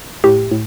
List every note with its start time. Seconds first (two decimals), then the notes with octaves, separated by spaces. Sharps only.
0.24 A2 G4
0.52 A2